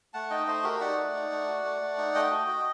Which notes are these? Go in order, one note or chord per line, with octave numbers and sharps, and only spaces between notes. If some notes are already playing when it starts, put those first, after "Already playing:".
A3 F#5 A5
D#4 D#5 G5
A3 C5 D#5
F#4 G4 A#4
D#4 D5 F#5
A3
D#4
A3
F#4
A3
A3
D#4
A3 D#5 G5
F#4
F#4